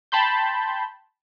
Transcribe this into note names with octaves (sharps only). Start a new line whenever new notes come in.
G5 A5 B5 C6 G6